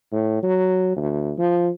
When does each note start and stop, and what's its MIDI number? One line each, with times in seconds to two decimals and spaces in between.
0.12 0.39 45
0.43 0.96 54
0.96 1.33 38
1.38 1.68 53